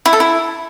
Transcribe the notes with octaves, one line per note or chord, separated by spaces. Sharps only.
E4
A4
E4